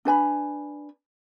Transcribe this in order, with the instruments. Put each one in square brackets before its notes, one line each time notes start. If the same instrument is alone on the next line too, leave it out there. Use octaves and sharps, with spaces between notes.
[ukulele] D4 B4 G#5 B5